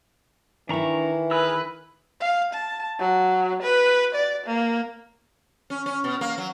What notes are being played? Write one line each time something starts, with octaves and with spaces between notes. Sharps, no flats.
D#3 E3 D4 E4 A#5 C#6
G#4 A#4 B4 E6
F5
A5
F#3
B4
D5
A#3
C#4
C#4
B2
A#3
F#3